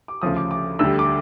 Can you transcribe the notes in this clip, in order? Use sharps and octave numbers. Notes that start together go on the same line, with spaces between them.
D6
D2 C#3 F3 D#6
D6
D6
D2 D3 G3 E6
D6